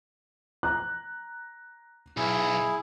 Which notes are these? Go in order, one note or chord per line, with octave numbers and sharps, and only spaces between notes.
A#5 F#6
B1 E4 G#4